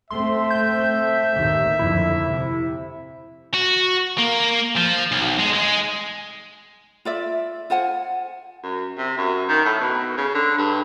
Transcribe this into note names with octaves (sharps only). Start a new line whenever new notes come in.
A3 C4 E5 C6
G6
D#2 A2 D#3
F2 D3 E4
C3
F#4
A#3
F3
B1
G#3
G#3
F4 D5 E5
F4 C5 F#5 G#5
F#2
C3
F#2
D#3
A2
B2
C#3
D3
G2